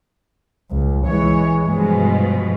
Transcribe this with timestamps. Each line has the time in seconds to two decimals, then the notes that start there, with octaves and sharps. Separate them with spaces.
0.71 C#2
1.06 E3 G#3 C#5
1.66 G2 B2 F3 G#3